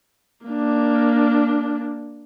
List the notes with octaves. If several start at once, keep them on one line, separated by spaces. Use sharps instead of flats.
A#3 D4